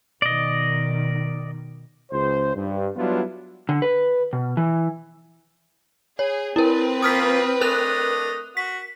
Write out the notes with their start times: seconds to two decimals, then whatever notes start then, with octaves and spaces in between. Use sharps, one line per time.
0.22 B2 D#3 D5 D#5
2.12 C#2 C5
2.55 G2
2.96 F#3 G3 B3 D4 E4 F4
3.69 D3
3.82 B4
4.33 B2
4.57 E3
6.19 G#4 C#5
6.56 C4 E4 A#4 B4
7.02 F3 A#3 F4 D#6 F6 B6
7.61 A3 D4 A#4 D#5 F#6 F7
8.57 F#4 B6